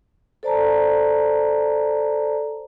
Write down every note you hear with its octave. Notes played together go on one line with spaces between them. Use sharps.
A4 C5 D5 A5 A#5